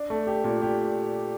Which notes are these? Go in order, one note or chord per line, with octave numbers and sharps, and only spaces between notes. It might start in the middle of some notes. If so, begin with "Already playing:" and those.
Already playing: D4
A3
G4
A#2
G4